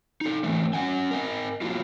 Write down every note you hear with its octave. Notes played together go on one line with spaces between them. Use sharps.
D#4 A4
D#3 E3 A3
C#4 F#5 G#5
A#4 D#5 G#5
F3 F#3 A#3 E4 F4